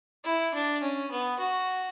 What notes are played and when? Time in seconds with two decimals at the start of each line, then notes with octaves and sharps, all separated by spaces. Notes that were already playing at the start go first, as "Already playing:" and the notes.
0.25 E4
0.54 D4
0.82 C#4
1.11 B3
1.39 F#4